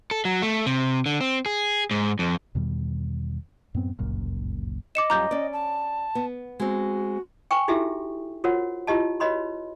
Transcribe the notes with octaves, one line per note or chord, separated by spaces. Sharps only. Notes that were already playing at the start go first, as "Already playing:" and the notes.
A4
F#3
A3
C3
D3
C4
G#4
G#2
F2
E2 B2 D#3 G3
F#2 A2 B3 C4
G1 C#2 F#2 A#2
D#5 D6 C#7 E7
F#2 G3 F4 A#5 D6 G6
C#4 D5
A5
B3
G#3 C4 F#4
G5 G#5 C#6
D#4 E4 F#4 G4 A4 E5
F4 F#4 A#4 C5 C#5 F#5
E4 F4 G4 D#5 A5
F#4 B4 C#5 D#5 B5 C6